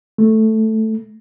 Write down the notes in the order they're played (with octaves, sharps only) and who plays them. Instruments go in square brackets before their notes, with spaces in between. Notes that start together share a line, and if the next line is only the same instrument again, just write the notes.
[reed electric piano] A3